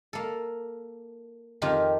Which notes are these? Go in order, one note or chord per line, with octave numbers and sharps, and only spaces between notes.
A#3 A4
F2 D#3 F4 G4 A#4